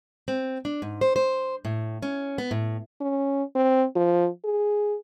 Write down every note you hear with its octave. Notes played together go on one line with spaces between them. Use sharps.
C4
D4
G#2
C5
C5
A2
C#4
B3
A2
C#4
C4
F3
G#4